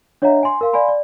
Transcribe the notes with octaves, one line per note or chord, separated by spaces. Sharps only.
D4 C#5 D#5 E5 F#5 A#5
G#5 C6
A#4 F5 C6
D5 F5 G#5 B5 C6
D5